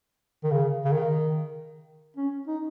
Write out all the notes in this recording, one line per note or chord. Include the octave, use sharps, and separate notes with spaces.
D#3
C#3
C#3
D#3
C#4
D#4